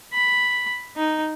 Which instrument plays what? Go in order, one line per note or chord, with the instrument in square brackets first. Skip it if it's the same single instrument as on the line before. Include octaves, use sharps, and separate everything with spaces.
[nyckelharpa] B5
D#4